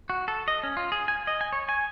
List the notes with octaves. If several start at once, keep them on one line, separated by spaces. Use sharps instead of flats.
F#4
A4
D#5
C#4
F4
G#4
G#5
D#5
G#5
C#5
G#5